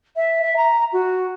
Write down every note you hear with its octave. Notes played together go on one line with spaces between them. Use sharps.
E5
E5
A#5
F#4